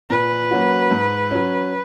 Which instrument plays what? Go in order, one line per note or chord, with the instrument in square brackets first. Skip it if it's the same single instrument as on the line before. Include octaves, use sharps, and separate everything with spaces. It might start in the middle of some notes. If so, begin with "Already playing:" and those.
[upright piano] A#2 [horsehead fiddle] B4
[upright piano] F#3 A#3 C#4 F#4
G#2
F#3 C#4